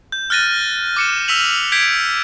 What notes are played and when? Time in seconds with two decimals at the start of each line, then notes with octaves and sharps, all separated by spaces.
0.12 G6
0.30 F6 F#6 A6 A#6 D#7
0.96 D6 C#7 E7
1.28 E6 F6 B6 D#7 F7 F#7
1.72 G6 G#6 B6 D7